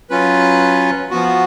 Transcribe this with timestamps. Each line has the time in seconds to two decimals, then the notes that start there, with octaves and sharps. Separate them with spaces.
0.10 F#3 C#4 F4 B4
1.10 F3 B3 F#4